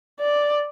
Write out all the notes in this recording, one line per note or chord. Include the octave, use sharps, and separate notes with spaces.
D5